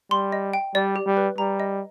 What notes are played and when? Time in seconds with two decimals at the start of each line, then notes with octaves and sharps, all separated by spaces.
0.11 G3 C6
0.32 D#5
0.54 G5
0.75 G3 D5
0.96 G4
1.07 G3
1.17 B4
1.38 G3 A#5
1.60 D#5